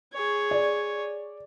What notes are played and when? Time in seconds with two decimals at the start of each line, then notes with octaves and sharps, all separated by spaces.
0.13 G#4 C#5
0.51 D5